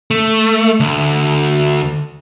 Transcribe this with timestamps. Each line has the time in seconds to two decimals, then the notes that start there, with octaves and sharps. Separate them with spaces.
0.11 A3
0.80 D2